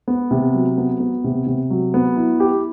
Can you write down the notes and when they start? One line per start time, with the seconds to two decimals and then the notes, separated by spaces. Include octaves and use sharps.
0.08 B3
0.31 C3
0.54 F#3
0.78 B3
1.00 B3
1.24 C3
1.46 C3
1.70 F#3
1.94 B3
2.16 E4
2.40 G4